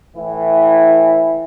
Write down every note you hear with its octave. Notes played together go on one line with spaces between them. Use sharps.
A2 E3 E4